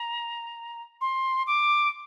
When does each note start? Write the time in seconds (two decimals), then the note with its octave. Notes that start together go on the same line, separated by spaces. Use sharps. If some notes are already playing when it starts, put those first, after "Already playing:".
Already playing: A#5
1.01 C6
1.47 D6